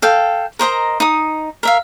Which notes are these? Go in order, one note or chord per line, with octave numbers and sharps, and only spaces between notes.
A4 F5 G5
A#4 C5 D#5 A#5
D#4 D#6
A#4 E5 F5